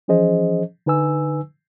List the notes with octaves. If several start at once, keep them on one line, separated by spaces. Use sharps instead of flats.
E3 F3 C#4 G#4 C5 D#5
D3 D#4 B4 G#5 E6